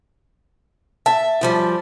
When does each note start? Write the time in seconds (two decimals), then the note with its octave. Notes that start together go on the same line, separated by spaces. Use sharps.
1.06 E5 A5
1.41 F#2 F3 G3